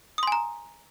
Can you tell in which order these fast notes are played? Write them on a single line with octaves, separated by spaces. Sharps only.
D#6 C6 G#5 A#5